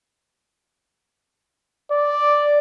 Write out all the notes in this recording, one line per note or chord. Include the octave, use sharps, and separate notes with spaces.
D5